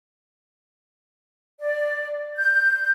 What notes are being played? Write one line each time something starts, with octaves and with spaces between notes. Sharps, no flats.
D5
G6